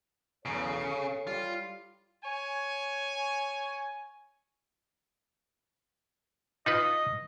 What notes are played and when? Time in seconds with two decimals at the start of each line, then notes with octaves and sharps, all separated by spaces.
0.45 B1 E2 C#3 A4 C#5
0.81 C7 C#7
1.27 G3 F4
2.24 C#5 G#5
6.66 D#4 F4 B4 D#5